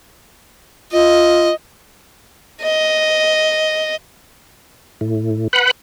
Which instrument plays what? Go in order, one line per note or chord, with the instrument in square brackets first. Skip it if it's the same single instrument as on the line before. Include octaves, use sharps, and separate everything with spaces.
[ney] F4 [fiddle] D#5
[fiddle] D#5
[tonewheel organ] A2
B4 F#5 B5